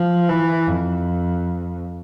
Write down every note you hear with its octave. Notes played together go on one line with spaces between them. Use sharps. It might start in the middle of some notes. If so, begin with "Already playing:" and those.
Already playing: F3
E3
F2